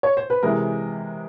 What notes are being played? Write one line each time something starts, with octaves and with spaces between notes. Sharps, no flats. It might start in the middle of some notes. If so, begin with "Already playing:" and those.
C#5
C5
B4
C3 E3 G#3 A#4